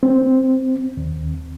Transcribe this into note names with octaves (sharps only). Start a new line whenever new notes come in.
C4
D#2